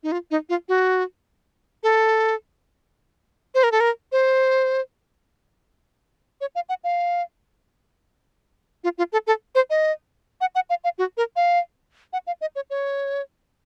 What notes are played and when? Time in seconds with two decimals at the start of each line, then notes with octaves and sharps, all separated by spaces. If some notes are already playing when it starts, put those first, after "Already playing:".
0.03 D#4
0.12 F4
0.31 D#4
0.49 F4
0.69 F#4
1.83 A4
3.55 C5
3.63 A#4
3.72 A4
3.80 A#4
4.12 C5
6.41 C#5
6.55 F5
6.69 F#5
6.84 F5
8.84 F4
8.98 F4
9.13 A4
9.27 A4
9.55 C5
9.70 D#5
10.41 F#5
10.55 F#5
10.70 F5
10.84 F5
10.98 F#4
11.17 A#4
11.36 F5
12.13 F#5
12.27 F5
12.41 D#5
12.56 C#5
12.70 C#5